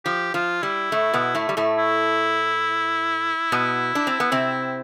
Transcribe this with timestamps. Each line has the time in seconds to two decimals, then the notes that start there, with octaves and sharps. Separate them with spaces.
0.05 F3 G4
0.34 F3 F4
0.63 G3 E4
0.92 A2 A3
1.14 B2 B3
1.35 A2 A3
1.49 G3
1.57 A2 A3
1.78 E4
3.52 B2 B3
3.95 D4
4.07 C4
4.20 B3
4.32 C3 C4